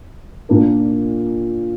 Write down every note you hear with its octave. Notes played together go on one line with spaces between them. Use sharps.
A#2 A#3 D4 A#4